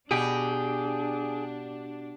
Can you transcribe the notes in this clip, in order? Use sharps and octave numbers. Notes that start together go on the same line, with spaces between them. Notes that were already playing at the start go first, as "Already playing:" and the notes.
B2 D4 G4 G#4